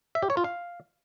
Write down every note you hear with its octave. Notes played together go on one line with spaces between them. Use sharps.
E5
G4
C#5
F4
F5